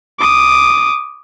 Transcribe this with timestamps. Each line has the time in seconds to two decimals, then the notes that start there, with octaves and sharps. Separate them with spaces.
0.19 D6 D#6